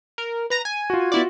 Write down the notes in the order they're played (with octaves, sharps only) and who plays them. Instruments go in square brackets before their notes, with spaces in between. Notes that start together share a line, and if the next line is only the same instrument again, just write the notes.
[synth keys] A#4
B4 A#5 A#6
G#5
[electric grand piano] F4 F#4
[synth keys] B3 E4 D5